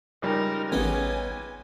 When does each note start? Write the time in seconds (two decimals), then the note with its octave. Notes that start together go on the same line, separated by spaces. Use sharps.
0.22 C#2 G3 D#4 A#4
0.72 A1 C#3 B3 D#4 G#5